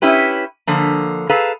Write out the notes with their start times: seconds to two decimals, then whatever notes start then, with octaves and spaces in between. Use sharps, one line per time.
0.02 C#4 E4 G4 B4
0.67 D3 F3 A#3
1.29 G#4 A4 B4 F5 A#5